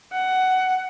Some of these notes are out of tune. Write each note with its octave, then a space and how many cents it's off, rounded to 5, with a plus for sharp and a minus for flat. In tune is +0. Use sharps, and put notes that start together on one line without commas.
F#5 +15